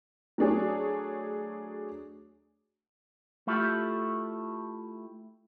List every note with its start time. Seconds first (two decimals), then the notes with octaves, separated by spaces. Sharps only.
0.38 F#3 A3 D4 G#4 C#5
3.47 A3 E4 F4 G4 A4